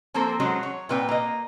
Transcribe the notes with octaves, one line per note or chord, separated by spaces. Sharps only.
F3 A#3 C4 A4 A#4 C5
F#3 G#3 C#4 F#4 C5
C#5
A#2 C4 B4 D5 G5
A#3 D#5